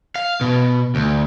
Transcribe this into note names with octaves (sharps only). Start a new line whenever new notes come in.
F5
B2
D2